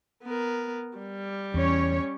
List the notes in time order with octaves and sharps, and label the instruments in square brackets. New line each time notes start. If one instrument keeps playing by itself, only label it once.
[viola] B3 A#4
G3
[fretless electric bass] E2 [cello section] C#4 C#5